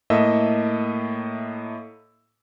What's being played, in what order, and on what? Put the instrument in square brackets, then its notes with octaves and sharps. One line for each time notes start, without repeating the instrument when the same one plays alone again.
[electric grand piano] A2 A#3 A4 D#5 E5 E6